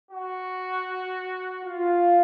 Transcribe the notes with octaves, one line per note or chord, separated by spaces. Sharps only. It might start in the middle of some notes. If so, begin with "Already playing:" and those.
F#4
F4